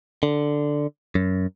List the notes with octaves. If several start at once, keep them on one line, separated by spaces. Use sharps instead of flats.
D3
F#2